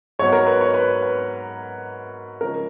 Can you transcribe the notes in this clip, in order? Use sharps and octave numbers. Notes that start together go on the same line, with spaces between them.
G#2 F#3 B3 C#5
A#4
B4
C#5
B4
B4
C#3 F3 G#3 C#4 A#4